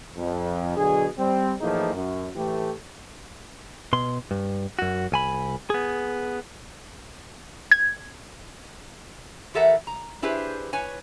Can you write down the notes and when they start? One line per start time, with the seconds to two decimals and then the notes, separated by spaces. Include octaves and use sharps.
0.18 F2
0.77 B2 D3 F#3 G#4
1.18 G3 C4
1.61 A2 E3 F3 A#3 D#4 G#4
1.94 F#2
2.36 A2 E3 A3 G4
3.93 B2 C6
4.31 G2
4.79 F#2 F#4
5.12 C2 G#5 B5
5.70 B3 G#4
7.71 G#6
9.54 E3 G4 A4 A#4 E5 F#5
9.87 A#5
10.22 D4 E4 G4 G#4 B4 C5
10.73 B4 C#5 G#5